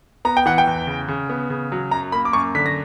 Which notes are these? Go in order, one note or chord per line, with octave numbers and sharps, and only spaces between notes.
B3 A#5
G5
E3 F#5
G5
E2
C#3
C#3
B3
C#3
F#3
F#2 A#5
A#3 B5
D6
F#2 C#6
D3 B6
A#6